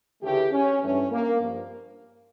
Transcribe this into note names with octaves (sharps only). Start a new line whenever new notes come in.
D2 C#3 E3 A3 G4
C#4
G2 E3 A3 C#4
A#3
G2 F3 A#3